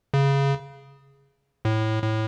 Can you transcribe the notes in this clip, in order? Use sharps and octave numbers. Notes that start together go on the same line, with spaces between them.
C#3
A2
A2